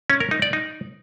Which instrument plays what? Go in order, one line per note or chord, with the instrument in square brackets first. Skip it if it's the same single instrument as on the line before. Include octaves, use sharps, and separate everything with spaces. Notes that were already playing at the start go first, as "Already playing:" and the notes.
[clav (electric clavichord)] C#4
A#4
D#4
D5
D#4